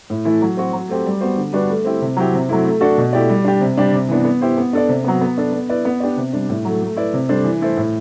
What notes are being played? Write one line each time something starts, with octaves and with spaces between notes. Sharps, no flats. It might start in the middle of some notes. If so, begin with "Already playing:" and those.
A2
E3 A3 E4 A4
F#3
C4 F#4
F#3
A3 C4 G4
G3
B3 F#4 C5
D3
G3 D4 F#4 B4
A3
C4 E4 G4
C3
F#3 C4 E4 G4
C3
F#3 A3 C4 E4
A3
D4 F#4 A4
B2
A3 E4 G4 D5
G3
D4 G4
C3
G3 D4 G4
C3
E3 B3 D4
B3
E4 G4 C5
B3
D4 A4 D5
C3
F#3 B3
B3
D4 A4
B3
E4 B4 D5
B3
D4 G4 D5
C3
G3 D4
A2
F#3 A3
A3
E4 B4 D5
C3
G3 D4 A4 C5
E3
A3 E4 A4 C5
A2